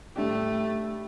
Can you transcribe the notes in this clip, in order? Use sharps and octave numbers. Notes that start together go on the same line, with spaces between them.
A2 G3 A3 D4 G4